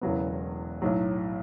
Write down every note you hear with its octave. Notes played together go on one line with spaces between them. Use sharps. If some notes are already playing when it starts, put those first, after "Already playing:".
E1 E2 C#3 F#3 B3
B1 A2 F#3